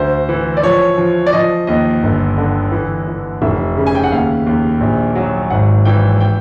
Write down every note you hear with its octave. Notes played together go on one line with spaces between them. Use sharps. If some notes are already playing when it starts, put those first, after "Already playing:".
Already playing: D2 C5
E3
D5
F3 C#5
F3
D5
F3 D#5
D#2 D#5
G1
D3
E3
E3
F1 E5
C#3
G#5
G5
F#5
D#2 F5
D#2
A#1
F#3
G#1 F#5
E3 G5
G5